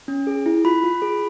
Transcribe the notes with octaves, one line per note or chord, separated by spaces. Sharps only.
C#4
G#4
E4
F4 B5
F4
G#4